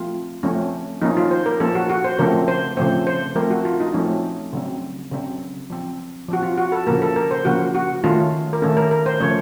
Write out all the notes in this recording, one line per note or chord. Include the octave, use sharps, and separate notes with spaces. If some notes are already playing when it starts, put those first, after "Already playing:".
Already playing: F3 A3 C4 F4
F3 A3 C4 C#4
F3 A#3 C#4 D#4
F4
C5
A#4
F3 A#3 C#4 A4
F#4
F#4
C5
C#3 F3 A3 C4 A#4
C5
C#3 F3 A3 C4 C5
C5
F3 A3 C4 A#4
F#4
F4
D#4
F3 A3 C4 C#4
C#3 F#3 C4
C#3 F#3 C4
F3 C4
F3 C4 F#4
F4
F#4
A4
C#3 F3 A#3 A#4
A4
A#4
C5
C#3 F3 A#3 F#4
F#4
D#3 A3 C#4 F4
A#4
D#3 A3 C#4 A4
A#4
A#4
C5
C#3 F3 A3 C#4 C#5